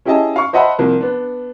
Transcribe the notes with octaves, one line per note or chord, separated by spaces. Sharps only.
C#4 E4 G4 G#4 D#5 A5
F5 C#6
C5 D#5 E5 F#5 A5 B5
C2 F3 A#3
B3 D4